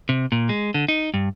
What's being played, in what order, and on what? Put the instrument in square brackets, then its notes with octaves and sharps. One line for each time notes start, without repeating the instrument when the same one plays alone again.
[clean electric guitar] C3
A#2
G#3
D3
D#4
G2